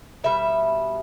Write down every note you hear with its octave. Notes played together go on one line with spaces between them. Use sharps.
B2 G3 B3 E5